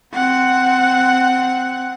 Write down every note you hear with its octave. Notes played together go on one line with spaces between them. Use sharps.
C4 F#5